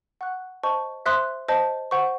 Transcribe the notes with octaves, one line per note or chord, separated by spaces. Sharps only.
F#5 C#6 F#6
C5 D#5 A5 C#6
C5 E5 C6 D#6 F#6
C5 D#5 A5
C5 F#5 C#6